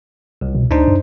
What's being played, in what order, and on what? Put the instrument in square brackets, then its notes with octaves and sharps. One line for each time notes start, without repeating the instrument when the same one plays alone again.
[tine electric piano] C2
[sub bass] B2
[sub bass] D2 [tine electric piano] D4 D#4 C5
[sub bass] F#2